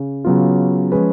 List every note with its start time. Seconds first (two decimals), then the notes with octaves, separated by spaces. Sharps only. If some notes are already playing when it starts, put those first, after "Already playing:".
Already playing: C#3
0.25 C#3 F#3 B3 F4
0.92 F3 G#3 C#4 G#4 B4